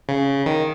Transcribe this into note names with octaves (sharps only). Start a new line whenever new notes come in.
C#3
D#3